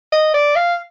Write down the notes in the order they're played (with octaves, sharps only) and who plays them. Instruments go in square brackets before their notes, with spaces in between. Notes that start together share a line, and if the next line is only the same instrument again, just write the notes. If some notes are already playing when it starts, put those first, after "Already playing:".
[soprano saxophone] D#5
D5
F5